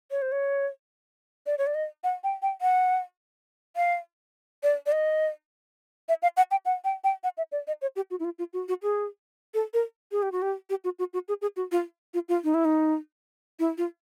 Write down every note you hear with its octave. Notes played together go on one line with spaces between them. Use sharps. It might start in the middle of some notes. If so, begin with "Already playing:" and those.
C#5
C5
C#5
D5
C#5
D5
D#5
F#5
G5
G5
F#5
F5
D5
D5
D#5
E5
F5
F#5
G5
F#5
G5
G5
F#5
E5
D5
D#5
C#5
G4
F#4
E4
F4
F4
F#4
F#4
G#4
A4
A#4
G#4
G4
F#4
G4
G4
F#4
F#4
F#4
G#4
G#4
F#4
F4
F4
F4
D#4
E4
D#4
E4
F4